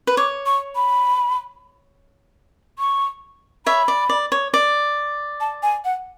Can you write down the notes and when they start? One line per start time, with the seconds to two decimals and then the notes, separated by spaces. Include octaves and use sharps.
0.07 B4
0.17 C#5 D6
0.46 C#6
0.76 B5
2.79 C#6
3.66 C#5 E5 B5
3.88 D5
4.09 D5
4.32 C#5
4.54 D5
5.40 A5
5.63 G#5
5.85 F#5